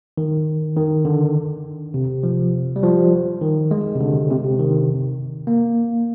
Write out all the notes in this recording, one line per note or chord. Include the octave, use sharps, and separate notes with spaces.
D#3
D#3
D3
C3
F3
G3
F3
D#3
G#3
C3
D3
C3
C3
D#3
A#3